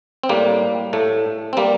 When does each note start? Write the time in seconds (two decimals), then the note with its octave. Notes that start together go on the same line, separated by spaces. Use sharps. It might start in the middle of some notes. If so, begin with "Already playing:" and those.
0.24 C4
0.29 A2 G3 A#3
0.93 A2 A3
1.53 C4
1.57 G3 A#3